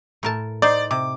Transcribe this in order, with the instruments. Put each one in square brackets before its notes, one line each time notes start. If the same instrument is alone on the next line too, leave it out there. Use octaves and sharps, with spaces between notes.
[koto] A2 A#4 A5
[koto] D#4 C5 [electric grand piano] D5
[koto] C3 [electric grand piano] D6